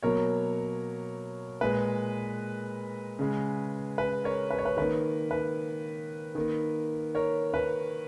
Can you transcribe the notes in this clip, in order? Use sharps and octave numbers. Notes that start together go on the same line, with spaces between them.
B2 F#3 A#3 A#4 C#5
A#2 G#3 B4
C#3 G#3
B4
A#4 C#5
B4
C#5
B4
D#3 A#3 B4
B4
D#3 A#3
A#4 C#5
B4